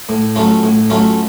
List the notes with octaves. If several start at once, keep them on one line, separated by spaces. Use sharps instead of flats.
A2
F#3 A3 C#4 F4
A2
F#3 A3 C#4 F4